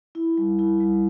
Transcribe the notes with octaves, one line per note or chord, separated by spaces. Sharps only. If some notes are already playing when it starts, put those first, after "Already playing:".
E4
G3
E4
G3